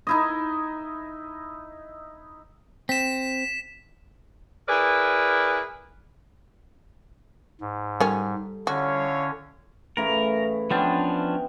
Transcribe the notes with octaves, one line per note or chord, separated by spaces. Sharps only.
D#4 E4 D#5
C4 B6 E7
E4 G#4 A#4 B4 D5
G#2
D#3 G3 C#4 A4
D3 C#4 E4 F#4 C#5 F5
A2 C#3 E3 A#4
F3 B3 C#4 D4 G5